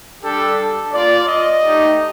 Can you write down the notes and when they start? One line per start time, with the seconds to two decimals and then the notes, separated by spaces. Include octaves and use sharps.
0.23 G3 D4 G4 A4
0.93 A#3 F4 D5
1.28 D#5
1.63 A3 D#4 G4